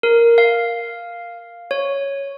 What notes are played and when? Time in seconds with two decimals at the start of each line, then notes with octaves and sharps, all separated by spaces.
0.03 A#4
0.38 F5
1.71 C#5